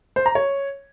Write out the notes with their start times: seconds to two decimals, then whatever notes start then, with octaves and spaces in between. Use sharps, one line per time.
0.16 C5
0.26 A#5
0.35 C#5